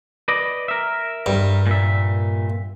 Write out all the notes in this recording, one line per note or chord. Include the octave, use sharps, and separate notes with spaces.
B4 D5 D#5
A#4 E5
G2
A#2 E5